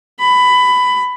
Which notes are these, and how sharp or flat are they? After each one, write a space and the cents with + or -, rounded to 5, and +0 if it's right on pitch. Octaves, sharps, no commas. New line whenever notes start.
B5 +15